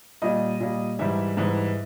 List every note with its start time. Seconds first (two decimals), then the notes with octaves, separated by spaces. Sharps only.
0.22 A#2 G3 D#5
0.60 A#2 G3
0.99 G#2 E3 G3 E5
1.37 G#2 E3 G3